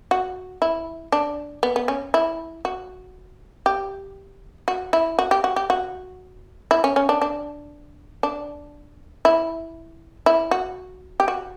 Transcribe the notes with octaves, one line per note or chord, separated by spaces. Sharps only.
F#4
E4
D4
B3
B3
C#4
E4
F#4
G4
F#4
E4
F#4
G4
F#4
G4
F#4
E4
C#4
C#4
D4
D4
D4
E4
E4
F#4
G4
F#4